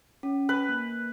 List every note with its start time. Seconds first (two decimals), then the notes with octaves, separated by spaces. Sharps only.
0.23 C#4
0.49 B4
0.69 A#3